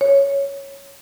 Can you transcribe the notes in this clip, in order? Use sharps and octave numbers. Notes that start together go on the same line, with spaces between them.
C#5